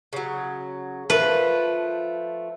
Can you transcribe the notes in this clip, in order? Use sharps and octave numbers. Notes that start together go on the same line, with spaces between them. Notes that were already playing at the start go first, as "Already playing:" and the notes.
C#3 F#3
F3 A3 B4